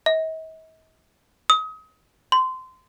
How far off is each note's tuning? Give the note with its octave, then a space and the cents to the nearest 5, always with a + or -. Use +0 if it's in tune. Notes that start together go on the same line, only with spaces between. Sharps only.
D#5 +45
D#6 +35
C6 -20